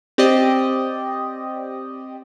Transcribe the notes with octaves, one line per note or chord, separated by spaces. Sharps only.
C4 G4 D5 D#5